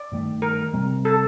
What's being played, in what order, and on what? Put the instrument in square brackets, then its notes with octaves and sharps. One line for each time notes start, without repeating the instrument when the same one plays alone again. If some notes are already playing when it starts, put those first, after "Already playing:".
Already playing: [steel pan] D5
[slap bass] G2 D#3 A3
[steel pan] A#4
[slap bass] C3 G3 C4
[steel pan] A4